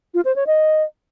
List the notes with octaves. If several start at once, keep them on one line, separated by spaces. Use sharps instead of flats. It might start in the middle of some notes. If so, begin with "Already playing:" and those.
F4
C5
C#5
D#5